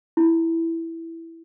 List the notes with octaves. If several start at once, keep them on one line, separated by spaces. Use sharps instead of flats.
E4